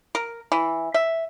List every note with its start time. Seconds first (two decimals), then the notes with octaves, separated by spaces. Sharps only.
0.15 A#4
0.52 E3
0.94 E5